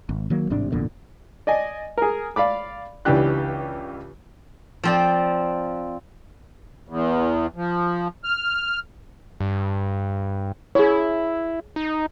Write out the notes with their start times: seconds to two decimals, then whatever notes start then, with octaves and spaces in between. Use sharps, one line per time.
0.09 G#1
0.30 D#3 F#3 A#3
0.50 A1 G#2 C3 D4
0.72 G#1 E2 A#2 D3
1.47 D5 D#5 G#5
1.98 G#4 A#4
2.36 D5 F5 B5 D6
3.05 C#2 E3 D4 G4 F#6
4.83 F3 C4 D5
6.88 E2
7.56 F3
8.24 F6
9.40 G2
10.75 E4 G#4 C#5
11.76 D#4